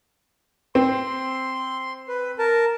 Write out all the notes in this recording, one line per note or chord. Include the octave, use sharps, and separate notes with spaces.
C4 C6
B4
A#4 A5